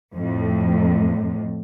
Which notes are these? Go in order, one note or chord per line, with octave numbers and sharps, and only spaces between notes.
F2 A2